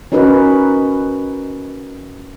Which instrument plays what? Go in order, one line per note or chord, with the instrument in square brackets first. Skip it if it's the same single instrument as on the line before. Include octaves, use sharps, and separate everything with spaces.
[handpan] C#4 D#4 F#4 A#4 B4